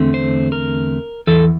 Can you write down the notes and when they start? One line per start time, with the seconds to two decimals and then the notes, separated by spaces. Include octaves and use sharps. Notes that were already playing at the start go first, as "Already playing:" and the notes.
Already playing: E2 D3 A3 C4
0.14 C5
0.52 A#4
1.27 E2 E3 A4